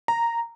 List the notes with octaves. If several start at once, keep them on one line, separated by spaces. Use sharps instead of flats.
A#5